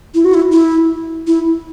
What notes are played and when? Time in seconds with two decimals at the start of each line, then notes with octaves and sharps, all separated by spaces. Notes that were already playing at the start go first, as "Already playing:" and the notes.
0.15 E4
0.24 F#4
0.34 E4
0.53 E4
1.27 E4